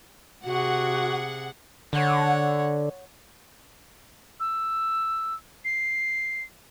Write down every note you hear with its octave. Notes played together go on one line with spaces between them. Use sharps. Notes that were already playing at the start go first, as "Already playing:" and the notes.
C3 F#4 G#4 F#5
D3 C#5 F#5
E6
C7